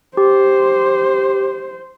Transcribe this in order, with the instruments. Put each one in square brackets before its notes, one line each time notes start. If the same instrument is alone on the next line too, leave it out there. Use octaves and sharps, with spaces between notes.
[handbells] G4 [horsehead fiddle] C5